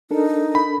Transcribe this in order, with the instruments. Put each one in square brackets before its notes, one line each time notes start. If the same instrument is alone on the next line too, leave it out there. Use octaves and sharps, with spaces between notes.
[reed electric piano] D4 A4 A#4 [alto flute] D#4
[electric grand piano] B5